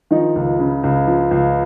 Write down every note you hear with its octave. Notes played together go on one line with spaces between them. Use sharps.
D#3 F3 D#4
C#2
C#3
C#2
F3
C#2